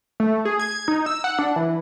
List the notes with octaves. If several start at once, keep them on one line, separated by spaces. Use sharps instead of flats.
A3
G#4
G#6
D#4
E6
F#5
D4
E3